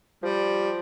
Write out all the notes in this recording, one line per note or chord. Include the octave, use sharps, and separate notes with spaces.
F3 G3